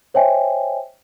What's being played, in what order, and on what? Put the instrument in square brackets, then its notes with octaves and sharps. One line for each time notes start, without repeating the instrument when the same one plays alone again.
[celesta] C5 C#5 D#5 E5 G5 G#5